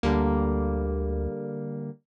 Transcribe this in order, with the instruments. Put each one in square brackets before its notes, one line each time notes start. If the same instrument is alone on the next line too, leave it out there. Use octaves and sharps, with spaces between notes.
[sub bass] D2 [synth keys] D3 G3 A#3